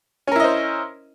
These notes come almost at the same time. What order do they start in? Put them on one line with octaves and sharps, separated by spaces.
C#4 A#4 E4 D#5 C5